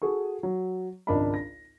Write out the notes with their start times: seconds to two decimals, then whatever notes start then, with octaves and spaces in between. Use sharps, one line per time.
0.02 F#4 G#4 A4 C#6
0.43 F#3
1.07 G#1 C#2 D4 A#4 D#5 B5
1.34 A#6